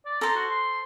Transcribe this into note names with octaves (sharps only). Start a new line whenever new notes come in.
D5
A4 C5 A#5
F#4
C6